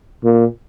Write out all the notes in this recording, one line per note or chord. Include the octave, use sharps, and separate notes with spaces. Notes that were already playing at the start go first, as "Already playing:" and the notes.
A#2